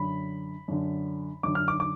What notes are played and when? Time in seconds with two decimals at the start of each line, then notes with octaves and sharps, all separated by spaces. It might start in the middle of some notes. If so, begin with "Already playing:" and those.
Already playing: F#2 D3 B5
0.68 F#2 D3
1.43 F#2 D3 D6
1.55 F6
1.68 D6
1.80 D6